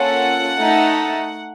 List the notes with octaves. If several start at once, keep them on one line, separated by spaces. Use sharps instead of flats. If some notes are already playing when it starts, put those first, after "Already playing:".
Already playing: A#3 C#4 F4 A4 F#5
A3 D#4 A4